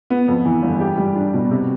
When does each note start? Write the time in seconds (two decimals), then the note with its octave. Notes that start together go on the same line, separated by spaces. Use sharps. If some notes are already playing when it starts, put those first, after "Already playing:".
0.10 B3
0.28 F2
0.45 E3
0.62 G1
0.80 G4
0.97 G3
1.16 D4
1.34 B2
1.51 C3